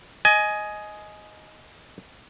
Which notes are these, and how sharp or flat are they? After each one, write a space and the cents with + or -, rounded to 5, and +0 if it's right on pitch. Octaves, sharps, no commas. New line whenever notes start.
D#5 +0 G#5 +15